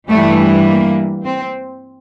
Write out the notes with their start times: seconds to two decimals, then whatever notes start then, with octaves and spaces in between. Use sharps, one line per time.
0.11 G2 E3 G3 A3
0.68 A#3
1.24 C4